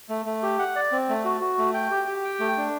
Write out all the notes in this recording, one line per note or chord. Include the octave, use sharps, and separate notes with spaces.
A3
A3
G4
F#5
D5
C4
A3
F#4
F#4
A3
G5
G4
G4
G5
A3
D4